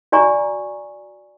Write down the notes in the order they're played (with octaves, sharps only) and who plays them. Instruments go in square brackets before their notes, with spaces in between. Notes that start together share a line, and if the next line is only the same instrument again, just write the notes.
[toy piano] F#4 D5 G#5 A#5 C#6